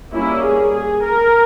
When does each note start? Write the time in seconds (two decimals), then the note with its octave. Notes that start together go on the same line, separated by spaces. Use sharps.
0.13 G3 A#3 C#4 E4
0.43 G#4
0.73 G#4
1.03 A#4